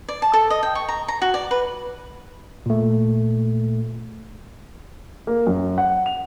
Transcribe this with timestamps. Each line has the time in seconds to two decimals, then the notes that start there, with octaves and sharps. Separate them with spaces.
0.08 D5
0.22 A5
0.33 A4
0.50 D#5
0.63 G5
0.75 C#6
0.88 A#5
1.08 A#5
1.22 F#4
1.34 D5
1.51 B4
2.66 A#2 A3
5.27 A#3
5.47 F#2
5.78 F#5
6.06 F7